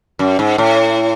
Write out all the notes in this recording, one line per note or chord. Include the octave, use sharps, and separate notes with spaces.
F#2
G#2
A2